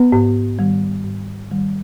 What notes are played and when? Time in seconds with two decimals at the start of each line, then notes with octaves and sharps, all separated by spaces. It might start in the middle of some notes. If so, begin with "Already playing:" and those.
Already playing: B3 B4
0.12 G#2
0.59 D#3 G3
1.04 G#2
1.51 D#3 G3